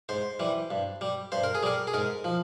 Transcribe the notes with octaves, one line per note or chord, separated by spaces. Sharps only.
G#2 C5
E3 G3
G2
G3
G2 C5
A#4
G#4
G3 A#4
G#4
G#2 A#4
F3